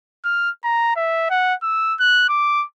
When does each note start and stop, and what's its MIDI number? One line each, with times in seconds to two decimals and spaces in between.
0.25 0.50 89
0.64 0.95 82
0.96 1.28 76
1.30 1.54 78
1.63 1.95 88
2.00 2.24 90
2.29 2.65 86